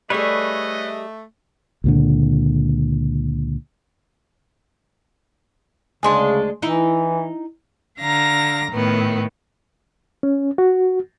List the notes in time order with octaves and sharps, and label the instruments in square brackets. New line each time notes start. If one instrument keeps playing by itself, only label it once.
[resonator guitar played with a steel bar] G3 G#4 [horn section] A3 [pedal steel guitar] B4 C#5 E5 [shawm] D#5
[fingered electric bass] C#2 A#2 D3
[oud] D2 G#3 D4 [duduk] C#3 [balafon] G#5 C6
[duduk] E3 [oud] D#4 E4
[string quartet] D3 F5 A#5 A#6
A2 D#3 B3
[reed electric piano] C#4
F#4